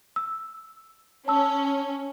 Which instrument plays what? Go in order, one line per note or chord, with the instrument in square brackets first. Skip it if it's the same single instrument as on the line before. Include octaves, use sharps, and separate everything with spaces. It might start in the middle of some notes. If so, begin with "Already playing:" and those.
[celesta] E6
[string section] C#4 [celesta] A5 E6